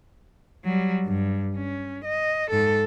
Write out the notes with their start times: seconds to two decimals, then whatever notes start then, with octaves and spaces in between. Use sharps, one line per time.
0.64 F#3 G3
1.05 G2
1.56 C#4
2.05 D#5
2.51 G#2 A4